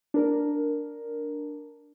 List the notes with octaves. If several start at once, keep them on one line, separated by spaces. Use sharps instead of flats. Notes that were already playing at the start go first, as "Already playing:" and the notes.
D4 A#4